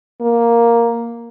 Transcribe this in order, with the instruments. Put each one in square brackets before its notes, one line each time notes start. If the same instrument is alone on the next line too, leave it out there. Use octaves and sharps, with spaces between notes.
[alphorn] A#3